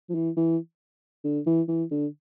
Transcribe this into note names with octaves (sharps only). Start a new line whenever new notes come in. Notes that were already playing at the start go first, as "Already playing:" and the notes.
F3
E3
E3
D3
E3
E3
D3